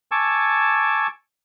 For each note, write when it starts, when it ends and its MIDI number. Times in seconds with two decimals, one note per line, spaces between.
0.11 1.07 80
0.11 1.07 81
0.11 1.07 85
0.11 1.07 86
0.11 1.07 88